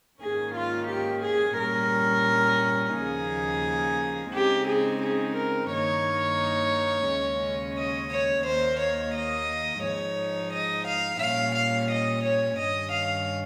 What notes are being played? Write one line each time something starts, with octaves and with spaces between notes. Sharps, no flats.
G#2 D#3 A#3 C#4 G#4
F4
G4
G#4
A#2 G3 C#4 A#4
D#2 C#3 F3 A#3 D#4 G#4
C#3 G#3 C4 D#4 G4
G#4
G#4
A#4
G2 D#3 A#3 D#4 C#5
D#2 C#3 G#3 C#4
D#5
C#5
D#2 D#3 A#3 C5
C#5
D#5
G#2 F3 G#3 D#4 C#5
D#5
F5
A#2 G3 C#4 F5
F5
D#5
C#5
G2 D#3 G3 C#4 D#5
F5